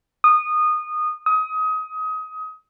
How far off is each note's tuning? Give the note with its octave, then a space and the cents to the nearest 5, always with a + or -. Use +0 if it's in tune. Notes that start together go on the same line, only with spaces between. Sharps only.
D#6 -20
D#6 +25